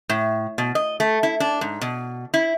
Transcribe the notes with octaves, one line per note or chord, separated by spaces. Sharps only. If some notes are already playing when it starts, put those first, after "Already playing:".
A2
B2
D#5
A3
E4
D4
G#2
B2
E4